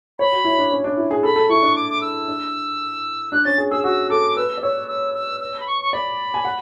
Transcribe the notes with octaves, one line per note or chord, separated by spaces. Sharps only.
C#5 B5
F#4
E4
D4
C#4
D4
E4
G#4
A4 B5
A4
E4 C#6
D4
D6
D6
E6
D4
D4 F#6
C#4 A6
G#4
G#4 E6
F#4 E6
A4 D6
B4 E6
D5
C#5 E6
E6
E6
E6
B5
C#6
C#6
D5 B5
G#5
F#5